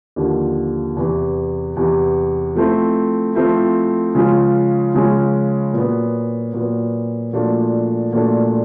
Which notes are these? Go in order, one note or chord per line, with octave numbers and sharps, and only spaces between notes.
D#2 D3 F3
E2 C3 E3
E2 C3 E3
F3 A3 C4 E4
F3 A3 C4 E4
C#3 F3 G#3 C#4 F4
C#3 F3 G#3 C#4 F4
A#2 F#3 B3
A#2 F#3 B3
A#2 F3 A3 D4 F#4
A#2 F3 A3 D4 F#4